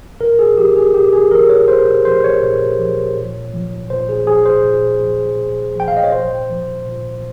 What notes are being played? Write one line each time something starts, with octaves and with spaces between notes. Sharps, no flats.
A#2 A#4
G#4
F3 G4
G#4
A#2 G4
G#4
F3 A#4
C#5
A#2 C5
F3 C5
C#5
A#2
F3
A#2
F3
A#2 C5
G#4
F3 G#4
C5
A#2
F3
A#2
F3 G5
F5
D#5
C#5
A#2 C5
F3
A#2